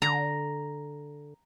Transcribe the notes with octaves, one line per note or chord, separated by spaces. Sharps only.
D3 A#5